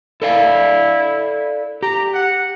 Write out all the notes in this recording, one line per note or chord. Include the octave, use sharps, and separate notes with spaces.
E4 A4 D5 F5
G4 A#5
F#5